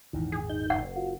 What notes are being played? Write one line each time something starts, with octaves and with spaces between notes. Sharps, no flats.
G#1 E2 A#2 D#3 E3
G#4
D#4 G6
F#1 F#5
F4 F#4